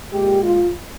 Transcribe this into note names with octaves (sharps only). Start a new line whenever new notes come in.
A#2 G#3 G4
F4